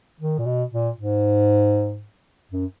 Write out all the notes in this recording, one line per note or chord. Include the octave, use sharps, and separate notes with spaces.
D#3
A#2
B2
A#2
G#2
F#2